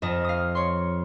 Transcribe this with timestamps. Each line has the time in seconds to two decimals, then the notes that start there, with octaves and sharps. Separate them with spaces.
0.02 F2 D#5 A5
0.24 F5 D#6
0.55 C#5 C6